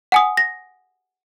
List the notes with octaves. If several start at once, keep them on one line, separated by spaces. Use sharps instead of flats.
F#5 G#5 D#6
A#6